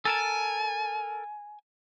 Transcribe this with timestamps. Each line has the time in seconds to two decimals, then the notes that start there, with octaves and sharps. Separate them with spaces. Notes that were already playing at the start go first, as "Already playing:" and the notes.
0.05 A4 A#4 G#5 A5